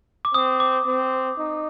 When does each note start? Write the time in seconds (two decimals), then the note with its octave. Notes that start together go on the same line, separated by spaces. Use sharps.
0.25 D6
0.34 C4 D#6
0.60 D6
0.86 C4
1.38 D#4